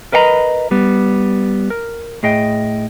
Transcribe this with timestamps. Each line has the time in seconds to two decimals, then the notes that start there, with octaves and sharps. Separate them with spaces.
0.12 A#4 B4 D#5 F#5 A#5 B5
0.71 G3 B3
1.70 A#4
2.23 A2 G#4 D#5 G5